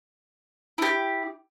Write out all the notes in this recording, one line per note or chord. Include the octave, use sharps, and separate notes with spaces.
E4 G4